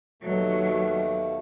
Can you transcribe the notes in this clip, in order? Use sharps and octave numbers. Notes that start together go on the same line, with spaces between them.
D#2 B2 F#3 A3